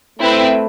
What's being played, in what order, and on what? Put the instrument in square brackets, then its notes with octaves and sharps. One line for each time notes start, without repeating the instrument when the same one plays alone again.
[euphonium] A3 [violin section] C4 E4 B4 E5